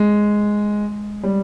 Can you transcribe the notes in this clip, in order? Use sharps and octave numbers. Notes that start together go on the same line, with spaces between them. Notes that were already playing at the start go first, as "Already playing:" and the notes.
Already playing: G#3
G3